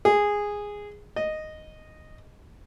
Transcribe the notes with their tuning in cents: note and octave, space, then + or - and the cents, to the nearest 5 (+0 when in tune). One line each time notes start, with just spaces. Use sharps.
G#4 -10
D#5 -5